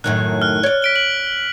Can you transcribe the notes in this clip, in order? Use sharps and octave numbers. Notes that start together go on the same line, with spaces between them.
F#2 A2 D#3 F#6
F6 F#6
C#5 D5
B6 D7 G7
F#7